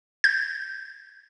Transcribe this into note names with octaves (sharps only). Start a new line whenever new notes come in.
G6